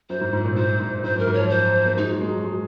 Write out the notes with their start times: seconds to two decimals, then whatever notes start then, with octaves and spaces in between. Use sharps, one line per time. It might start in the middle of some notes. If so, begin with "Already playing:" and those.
0.10 F#2 C5
0.21 G#2
0.33 G#2
0.45 A#2
0.56 G#2 C5
0.80 G#2
1.04 G#2 C5
1.16 F#2
1.19 A#4
1.27 G#2
1.34 F3 C#5
1.50 C5
1.86 A#3
1.97 G#3 D#4
2.09 F#3
2.21 G#3
2.33 F#3
2.44 G#3